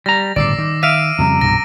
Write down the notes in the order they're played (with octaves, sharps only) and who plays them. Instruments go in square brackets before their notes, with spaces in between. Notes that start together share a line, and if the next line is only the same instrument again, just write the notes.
[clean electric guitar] G3 A#5 [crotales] A#6
[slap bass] G1 A2 C#3 [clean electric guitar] D5 [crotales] D6 E6 C7
[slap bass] D#3
[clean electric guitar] E5 F5 [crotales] D7 D#7
[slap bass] F2 C#3 G3 [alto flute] A#5
[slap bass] C2 G2 B2 [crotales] A#6